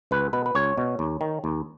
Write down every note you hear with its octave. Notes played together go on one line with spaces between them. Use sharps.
C#2 B4
B2 B4
B4
C#2 C#5
B2
D#2
D#3
D#2